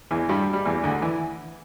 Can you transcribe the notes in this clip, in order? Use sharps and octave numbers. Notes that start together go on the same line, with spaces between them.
E2 E3
G2 G3
G3
E2 E3
D2 D3
E3